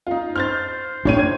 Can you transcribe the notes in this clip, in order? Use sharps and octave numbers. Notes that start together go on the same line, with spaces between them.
D#4 F4
C5 F6 G6 A6
A2 D4 C#5 D#7
G#6